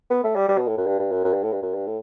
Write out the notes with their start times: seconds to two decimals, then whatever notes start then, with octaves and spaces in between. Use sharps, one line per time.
0.11 B3
0.24 A3
0.36 G3
0.49 G3
0.58 B2
0.67 A2
0.77 F#2
0.86 G2
0.99 G2
1.12 F#2
1.25 F#2
1.33 G2
1.43 A2
1.52 G2
1.63 F#2
1.74 G2
1.87 A2